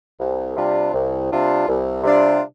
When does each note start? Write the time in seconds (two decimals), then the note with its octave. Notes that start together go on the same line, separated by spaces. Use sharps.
0.20 C2
0.57 C3 G3 D4 F4
0.93 C2
1.31 C3 G3 D4 F4
1.68 C2
2.04 C3 G3 D4 F4